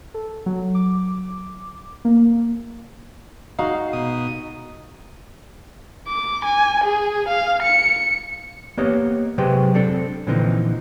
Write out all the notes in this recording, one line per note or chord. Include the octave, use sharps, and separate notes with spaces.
A4
F#3
D6
A#3
G#3 D#4 F#4 F5
B2 D#6
D6
G#5
G#4
F5
C#7
A#3 B3 G4 C#5 D#5
C3 F#3 G#3 G4 B4 C5
C4 D4 A4
A#2 D3 E3 F3 C4 D#4